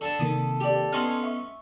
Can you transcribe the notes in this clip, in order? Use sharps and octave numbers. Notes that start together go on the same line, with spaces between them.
D3 A4 A5
C3 D#3 A#3 D#6
G4 D5
B3 C#4 D#4 G#5 C6 F6
E5 C#6